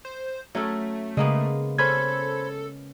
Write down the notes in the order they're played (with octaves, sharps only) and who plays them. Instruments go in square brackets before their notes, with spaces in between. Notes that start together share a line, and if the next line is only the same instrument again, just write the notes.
[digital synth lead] C5
[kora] F#3 C#4 A4 [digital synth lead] A3
[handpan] C#3 [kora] G#3 A#3 B3
[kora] C#4 [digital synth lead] A4 [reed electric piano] C5 B5 G#6